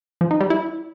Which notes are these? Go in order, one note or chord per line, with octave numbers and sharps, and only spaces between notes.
F3
D#4
G3
E4